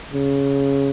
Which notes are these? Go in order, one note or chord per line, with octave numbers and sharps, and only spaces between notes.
C#3